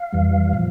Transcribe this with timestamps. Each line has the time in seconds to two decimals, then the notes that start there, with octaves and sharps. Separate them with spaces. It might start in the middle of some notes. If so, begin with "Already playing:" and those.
Already playing: F5
0.12 F2 E3 G3
0.53 A#2 F3